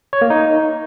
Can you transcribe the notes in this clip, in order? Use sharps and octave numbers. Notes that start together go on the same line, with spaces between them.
C#5
A#3
D#4